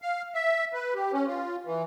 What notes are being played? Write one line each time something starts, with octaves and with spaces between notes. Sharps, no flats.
F5
E5
B4
G4
C#4
F4
E3